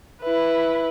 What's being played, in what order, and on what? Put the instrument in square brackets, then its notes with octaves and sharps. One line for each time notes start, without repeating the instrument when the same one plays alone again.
[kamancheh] E4 B4